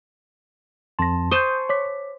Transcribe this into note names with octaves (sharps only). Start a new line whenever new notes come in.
F2 A5 C6 A#6
C5 G#5 A5 C#6 D#6 G6
C#5 D6 B6